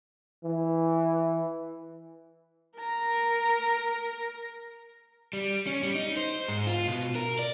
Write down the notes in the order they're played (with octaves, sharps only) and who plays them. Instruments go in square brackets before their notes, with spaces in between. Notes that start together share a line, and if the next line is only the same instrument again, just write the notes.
[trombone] E3
[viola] A#4 A#5
[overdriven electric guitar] G3
C#4
G3
D#4
C5
G#2
F4
B2
A#4
D5